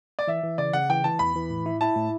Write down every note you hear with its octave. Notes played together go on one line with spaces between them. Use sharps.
D5
E3 E5
E3
C#3 D5
C#3 F#5
E3 G5
E3 A5
E2 B5
E3
A2
E4
E4 A5
A2